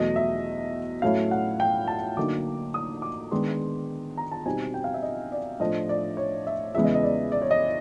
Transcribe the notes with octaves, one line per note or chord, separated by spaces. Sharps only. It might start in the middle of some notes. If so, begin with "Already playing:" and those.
Already playing: E2 B2 F#3 A3 D#5
E5
A2 F#3 A3 C#4 E4 F5
F#5
G5
A5
D3 F#3 A#3 D#4 D6
D#6
D6
D#3 G#3 B3 D4 C6
A#5
A5
B2 G3 C4 D#4 G#5
G5
F5
E5
D#5
D5
A2 F3 A3 D4 D#5
D5
C#5
E5
E2 C#3 E3 G#3 B3 E5
D#5
D#5
D5
D5
C#5
D#5